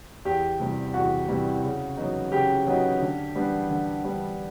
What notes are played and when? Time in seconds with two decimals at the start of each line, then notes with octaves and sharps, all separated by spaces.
0.25 E2 G4
0.60 C3 E3 G3
0.94 E2 F#4
1.28 C3 E3 G3
1.64 C#3
1.97 F#3 B3 D#4
2.32 C#3 G4
2.67 F#3 B3 D#4
3.01 D3
3.36 G3 B3 D4
3.70 D3
4.05 G3 B3 D4